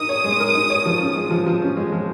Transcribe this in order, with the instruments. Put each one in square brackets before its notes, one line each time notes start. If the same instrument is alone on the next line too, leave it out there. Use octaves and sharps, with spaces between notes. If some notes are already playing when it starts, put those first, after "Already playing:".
Already playing: [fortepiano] D#4 A#4 [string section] D#6
[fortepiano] C#5
G#3
A#4
D#4
C#5
F3
C#4
G#3
F3
F3
C#4
G#3
F3